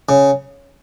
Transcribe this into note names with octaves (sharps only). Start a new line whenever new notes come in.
C#3